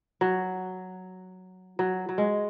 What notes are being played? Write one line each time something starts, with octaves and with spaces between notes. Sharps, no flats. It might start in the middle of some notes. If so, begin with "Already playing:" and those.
F#3
F#3
F#3
G#3